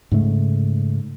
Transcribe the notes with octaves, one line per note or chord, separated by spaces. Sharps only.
G#2 C#3 A3